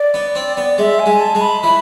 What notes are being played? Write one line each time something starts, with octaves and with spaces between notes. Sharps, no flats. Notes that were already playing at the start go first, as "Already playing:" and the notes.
Already playing: D5
B3
C4
B3
G#3 E5
G#5
G#3
A5
G#3
B5
E3 B5